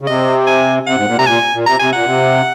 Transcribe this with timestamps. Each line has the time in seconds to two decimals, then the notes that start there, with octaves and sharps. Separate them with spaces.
0.02 C#3
0.07 C3 D#5
0.47 G#5
0.87 C3 F#5
0.97 G#2
1.07 A#2
1.16 C3 A#5
1.27 A#2 G#5
1.53 A#2
1.66 C3 A#5
1.79 C3 G#5
1.93 A#2 F#5
2.06 C3